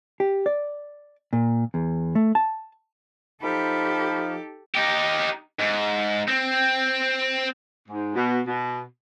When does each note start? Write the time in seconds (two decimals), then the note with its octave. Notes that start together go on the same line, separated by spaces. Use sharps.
0.20 G4
0.46 D5
1.33 A#2
1.74 E2
2.15 A3
2.35 A5
3.43 F3 D#4 G4 A4 B5
4.75 D#4 G4
5.59 G#2
6.28 C4
7.89 G#2
8.16 B2
8.47 B2